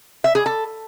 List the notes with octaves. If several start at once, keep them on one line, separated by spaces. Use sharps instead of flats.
E5
G#4
A4